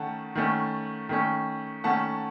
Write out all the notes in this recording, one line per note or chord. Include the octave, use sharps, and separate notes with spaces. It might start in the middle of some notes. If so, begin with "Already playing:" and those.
Already playing: D#3 A3 C#4 F#5 A5
D#3 A3 C#4
D#3 A3 C#4
D#3 A3 C#4 F#5 A5